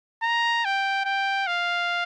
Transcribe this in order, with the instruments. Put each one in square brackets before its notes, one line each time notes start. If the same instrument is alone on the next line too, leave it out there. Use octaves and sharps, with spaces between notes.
[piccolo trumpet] A#5
G5
G5
F5